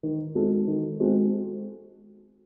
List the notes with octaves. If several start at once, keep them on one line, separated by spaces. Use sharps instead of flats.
D#3
G#3 C4 F#4 A4
D#3
G#3 C4 F#4 A4